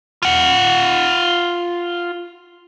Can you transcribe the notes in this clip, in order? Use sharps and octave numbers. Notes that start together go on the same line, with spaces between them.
F4 F#5